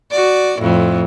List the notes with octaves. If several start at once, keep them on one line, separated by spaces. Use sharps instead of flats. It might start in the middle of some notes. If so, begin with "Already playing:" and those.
F#4 D5
F2 A2